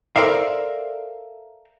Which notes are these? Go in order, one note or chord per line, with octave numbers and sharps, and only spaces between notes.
A4 A#4 C5 D5 E5 F5